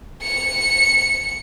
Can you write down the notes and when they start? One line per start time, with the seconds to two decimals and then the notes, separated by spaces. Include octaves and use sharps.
0.23 C#7